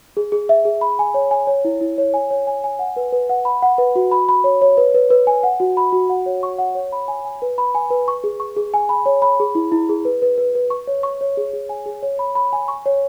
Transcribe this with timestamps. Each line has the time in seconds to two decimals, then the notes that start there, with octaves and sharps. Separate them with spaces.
0.17 G#4
0.32 G#4
0.49 E5
0.65 G#4
0.81 B5
0.99 G#5
1.14 C#5
1.31 G#5
1.47 C#5
1.65 E4
1.81 E4
1.98 C#5
2.14 G#5
2.30 C#5
2.47 G#5
2.64 G#5
2.79 F#5
2.96 B4
3.12 B4
3.29 F#5
3.45 B5
3.62 F#5
3.78 B4
3.95 F#4
4.11 B5
4.29 B5
4.44 C#5
4.62 C#5
4.77 B4
4.94 B4
5.10 B4
5.27 G#5
5.43 F#5
5.60 F#4
5.77 B5
5.92 F#4
6.09 F#5
6.26 C#5
6.43 C#6
6.58 F#5
6.75 C#5
6.92 B5
7.08 G#5
7.25 G#5
7.42 B4
7.58 B5
7.75 G#5
7.90 B4
8.08 C#6
8.24 G#4
8.40 C#6
8.57 G#4
8.74 G#5
8.89 B5
9.06 C#5
9.22 B5
9.40 G#4
9.55 E4
9.72 E4
9.89 G#4
10.05 B4
10.22 B4
10.38 B4
10.55 B4
10.70 C#6
10.87 C#5
11.03 C#6
11.21 C#5
11.37 G#4
11.53 G#4
11.69 G#5
11.86 G#4
12.03 C#5
12.19 B5
12.35 B5
12.53 G#5
12.68 C#6
12.86 C#5